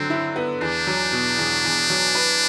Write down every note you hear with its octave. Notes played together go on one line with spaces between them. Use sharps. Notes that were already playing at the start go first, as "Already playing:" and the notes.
Already playing: D3 F#3 C4
E4
B3
E2 D4
F#3
B2
E2
E2
F#3
B4